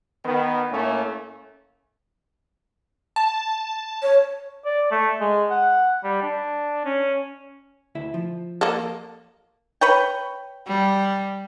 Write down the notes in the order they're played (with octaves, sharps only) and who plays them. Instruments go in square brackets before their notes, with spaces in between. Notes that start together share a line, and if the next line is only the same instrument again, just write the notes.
[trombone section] D#3 B3
A2 A3 A#3 C#4
[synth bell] A5
[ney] C#5
[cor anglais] D5
A3
G#3
F#5
G3
D4
C#4
[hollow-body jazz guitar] D2 E4 E5
F3
[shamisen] A#3 A4
[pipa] B4 C#5 G5
[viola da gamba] G3